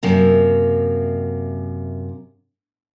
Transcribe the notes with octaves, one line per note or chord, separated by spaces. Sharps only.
F#2 C3 A#3